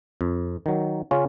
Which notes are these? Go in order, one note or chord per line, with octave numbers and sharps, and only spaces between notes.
F2
D#3 F#3
C#3 C#4 F4